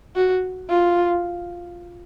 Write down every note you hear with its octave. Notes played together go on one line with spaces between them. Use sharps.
F#4
F4